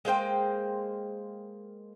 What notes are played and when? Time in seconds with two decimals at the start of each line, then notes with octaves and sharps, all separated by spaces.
0.05 G#3 A#3 C5 G5